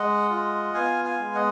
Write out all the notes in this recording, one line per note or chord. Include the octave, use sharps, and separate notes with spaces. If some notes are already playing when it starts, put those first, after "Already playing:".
Already playing: G#3 D#5 F#5
F4
B3 F5 G#5
F5 G#5
G#3
D#5 F#5